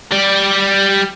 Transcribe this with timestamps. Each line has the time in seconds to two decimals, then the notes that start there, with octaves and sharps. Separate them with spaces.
0.12 G3 D5